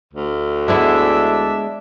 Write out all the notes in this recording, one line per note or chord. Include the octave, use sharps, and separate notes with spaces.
D2
G#3 B3 D4 E4 E5